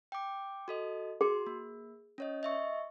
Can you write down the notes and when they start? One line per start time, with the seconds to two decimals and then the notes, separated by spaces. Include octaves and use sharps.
0.12 G5 D6
0.68 F#4 A4 D#5
1.21 F#4 G#4 C6
1.47 A#3
2.18 C#4 C#5 D#5
2.43 D#5 E5 C#6